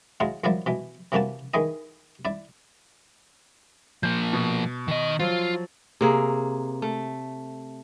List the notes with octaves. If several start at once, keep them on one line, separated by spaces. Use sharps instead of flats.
F#3 G#3 E4 F4
A#1 F3 F#3 E4 D5
B2 E3
C3 E3 A#3 F#4 A5
D#3 E3 G#4 D#5
E4 D5
F3 A#3 G6
B2
D#3 D#5
F3 F#3 F4
C3 A#3 G#4
A3